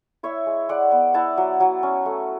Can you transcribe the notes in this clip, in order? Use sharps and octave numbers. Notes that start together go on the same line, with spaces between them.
E4 C#5 E5
G#3
G#3 D5 F#5
B3
E4 F#5 A5
F#3
F#3
C#4
A3